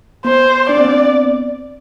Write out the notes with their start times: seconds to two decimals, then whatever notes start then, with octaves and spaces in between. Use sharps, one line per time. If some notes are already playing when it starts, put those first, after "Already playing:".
0.25 B3 C5
0.69 D4 D5
0.77 C4
0.84 B3
0.92 C4